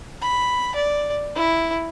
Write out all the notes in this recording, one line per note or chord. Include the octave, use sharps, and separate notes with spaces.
B5
D5
E4